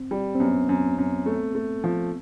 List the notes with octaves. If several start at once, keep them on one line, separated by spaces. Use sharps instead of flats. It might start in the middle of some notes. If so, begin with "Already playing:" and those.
Already playing: C4
G3
C4
F#2 B3
F#2
F#2
A3
A3
F3